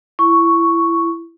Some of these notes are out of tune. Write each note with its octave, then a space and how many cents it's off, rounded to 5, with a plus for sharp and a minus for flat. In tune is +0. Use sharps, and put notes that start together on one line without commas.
E4 +20 C#6 +0